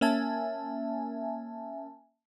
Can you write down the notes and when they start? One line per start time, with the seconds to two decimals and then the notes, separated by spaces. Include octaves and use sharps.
0.01 A#3 C#4 E5 G#5 A5